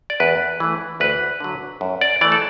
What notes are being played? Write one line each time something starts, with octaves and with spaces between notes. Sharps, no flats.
D5
E2 B4
E3 A3
D2 B4
D3 F#3
F#2
D5
E3 A3 D5
A4